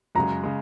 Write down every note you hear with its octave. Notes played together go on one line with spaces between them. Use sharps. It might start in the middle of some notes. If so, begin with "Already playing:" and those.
F#2 C#3 G#3 A#5
C#3 G#3